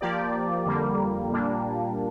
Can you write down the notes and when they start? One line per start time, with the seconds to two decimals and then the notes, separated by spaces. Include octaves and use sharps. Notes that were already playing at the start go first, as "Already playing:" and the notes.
0.01 F3 A#3 G4 D5
0.66 F2 D3 G3 A#3
1.32 A#2 G3 A#3 D4